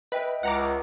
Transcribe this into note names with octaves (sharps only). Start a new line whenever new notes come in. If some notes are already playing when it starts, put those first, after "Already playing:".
B4 D#5 E5 G5
C#2 F#5 A#5 D6